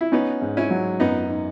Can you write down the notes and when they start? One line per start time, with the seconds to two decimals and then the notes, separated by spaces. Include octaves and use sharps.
0.01 E4
0.12 B3 C#4 D#4
0.42 G#2
0.57 C#4 E4
0.71 F#3
1.00 F#2 B3 D#4
1.30 D#4